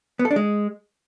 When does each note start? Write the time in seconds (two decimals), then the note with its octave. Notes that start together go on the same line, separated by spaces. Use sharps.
0.19 B3
0.25 A4
0.31 D4
0.36 G#3